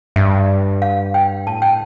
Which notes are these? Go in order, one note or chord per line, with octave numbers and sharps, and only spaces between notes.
G2 E5
F5
G5
A2 A5
G5